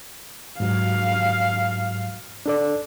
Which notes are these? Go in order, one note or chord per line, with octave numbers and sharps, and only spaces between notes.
G#2 F#3 F5
D4 A4 D5